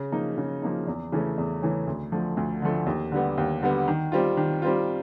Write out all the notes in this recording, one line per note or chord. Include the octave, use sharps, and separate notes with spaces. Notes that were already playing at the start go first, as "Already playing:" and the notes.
Already playing: C#3
F3 A#3 D#4
C#3
F3 A#3 D#4
E2
C#3 E3 A3 C#4
E2
C#3 E3 A3 C#4
D2
D3 F3 A3
D2
D3 F3 A3
D#2
D3 G3 B3
D#2
D3 G3 B3
D#3
G3 C4 F4
D#3
G3 C4 F4